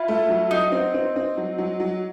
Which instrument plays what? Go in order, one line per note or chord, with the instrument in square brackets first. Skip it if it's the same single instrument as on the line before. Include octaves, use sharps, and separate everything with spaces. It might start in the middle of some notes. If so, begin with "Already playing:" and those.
Already playing: [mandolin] E4 [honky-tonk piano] F4
[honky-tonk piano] A3
F#3
[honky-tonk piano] F#3 [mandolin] D#4
[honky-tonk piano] C4
C4
C4
F#3
F#3
F#3